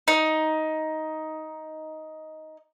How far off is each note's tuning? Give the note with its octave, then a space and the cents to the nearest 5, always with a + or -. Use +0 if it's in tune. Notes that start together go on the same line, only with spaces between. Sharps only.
D#4 +10